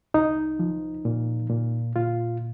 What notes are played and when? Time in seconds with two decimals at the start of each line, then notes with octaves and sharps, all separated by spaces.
0.14 C2 D#4
0.59 F3
1.05 A#2
1.50 A#2
1.96 A#2 F4